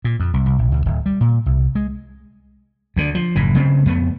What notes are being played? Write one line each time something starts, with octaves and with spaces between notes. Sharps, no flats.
A#2
F2
C2
C2
A#1
C#2
D1
G3
A#2
C2
G#3
D2 D3
F3
F#1 A2 E3
C#3 A3 C4
F2 A3 B3